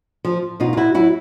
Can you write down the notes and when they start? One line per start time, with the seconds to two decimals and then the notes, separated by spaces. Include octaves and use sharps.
0.25 F3
0.60 B2 D#4 F4
0.73 F4
0.77 E4 F#4
0.95 F#3 E4 F#4